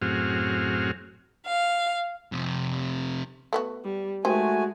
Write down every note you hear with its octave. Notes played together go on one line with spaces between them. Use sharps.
F#2 A2 C4 F#4 G#4 F6
F5
F2 C3
A3 B3 F#4
G3
D#3 G#3 A3 F#4 C5 G#5